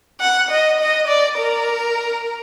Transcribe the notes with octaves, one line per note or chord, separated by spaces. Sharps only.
F#5
D#5
D#5
D5
A#4